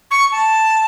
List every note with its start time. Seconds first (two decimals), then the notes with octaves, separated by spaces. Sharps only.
0.11 C#6
0.32 A5